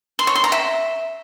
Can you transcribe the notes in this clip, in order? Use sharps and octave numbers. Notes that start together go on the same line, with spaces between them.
C6
C#5
C6
A#5
E5